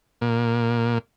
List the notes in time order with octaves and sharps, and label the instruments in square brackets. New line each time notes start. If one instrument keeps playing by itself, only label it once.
[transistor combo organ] A#2